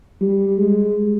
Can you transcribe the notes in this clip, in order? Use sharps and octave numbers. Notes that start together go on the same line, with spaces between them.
G3
G#3